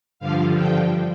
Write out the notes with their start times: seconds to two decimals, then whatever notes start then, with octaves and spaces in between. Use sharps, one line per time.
0.19 G2 D3 F3 F5
0.55 G5